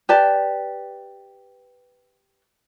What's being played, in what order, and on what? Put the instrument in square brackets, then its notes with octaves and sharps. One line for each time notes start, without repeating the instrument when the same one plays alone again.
[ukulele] G4 B4 D5 A5